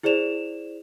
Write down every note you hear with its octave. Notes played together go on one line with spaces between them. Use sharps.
E4 G#4 C5 D5 E7 F7